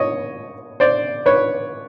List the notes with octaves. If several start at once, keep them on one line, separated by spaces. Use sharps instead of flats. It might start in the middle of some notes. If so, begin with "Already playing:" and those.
Already playing: C#5 D#5
C5 D5
B4 C#5